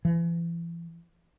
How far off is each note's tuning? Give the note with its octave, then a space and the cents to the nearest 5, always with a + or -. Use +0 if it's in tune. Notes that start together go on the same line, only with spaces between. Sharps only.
E3 +40